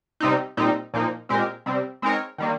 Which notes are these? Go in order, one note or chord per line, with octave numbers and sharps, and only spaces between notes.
C3 G3 C4 D#4
A#2 G3 C4 D#4
A#2 F3 A#3 D#4
A#2 G#3 C4 G4 A#4
C3 G3 C4
G#3 C4 D#4 A#4 C#5
D#3 G3 A#3